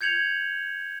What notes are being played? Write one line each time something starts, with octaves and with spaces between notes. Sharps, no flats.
G6 G#6 C#7 F7 F#7